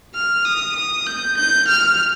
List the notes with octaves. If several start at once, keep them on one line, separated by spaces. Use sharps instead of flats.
F6
D#6
D#6
G6
G6
F6